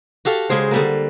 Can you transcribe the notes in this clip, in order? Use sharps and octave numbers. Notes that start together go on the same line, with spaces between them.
F#4 G4 A4 F5
C#3 G#3 G#4 C5
D3 G3 A#3